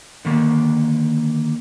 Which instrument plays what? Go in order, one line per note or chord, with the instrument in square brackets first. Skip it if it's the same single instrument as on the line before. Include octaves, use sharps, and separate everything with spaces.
[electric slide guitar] D3 D#3 A#3